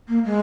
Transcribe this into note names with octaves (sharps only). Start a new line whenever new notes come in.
A#3
G#3